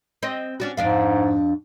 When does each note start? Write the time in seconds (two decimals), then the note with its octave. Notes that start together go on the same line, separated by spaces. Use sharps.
0.23 C4 D#5
0.60 C#4 D4 F#4
0.77 F2 G#2 D4 F5